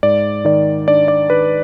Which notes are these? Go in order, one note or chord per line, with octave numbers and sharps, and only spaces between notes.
G#2 D5
D#3 D5
D4 D5
D5
D#3 B4